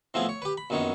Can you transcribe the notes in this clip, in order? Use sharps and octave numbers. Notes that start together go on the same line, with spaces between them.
A2 F3 B3 C4 E4 G#4
C#5
G4 B4
B5
A#1 F#2 D#3 B3 C#5